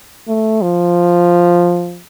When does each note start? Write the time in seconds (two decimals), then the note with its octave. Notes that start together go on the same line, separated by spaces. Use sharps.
0.28 A3
0.61 F3